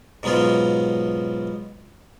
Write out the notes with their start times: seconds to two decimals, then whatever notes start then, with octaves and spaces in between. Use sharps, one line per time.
0.23 G#2 B2 F#3 B3 F4